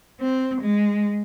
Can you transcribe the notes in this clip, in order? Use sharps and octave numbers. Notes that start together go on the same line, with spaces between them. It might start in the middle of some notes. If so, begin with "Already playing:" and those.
C4
G#3